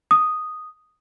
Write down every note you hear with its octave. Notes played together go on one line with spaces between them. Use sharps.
D#6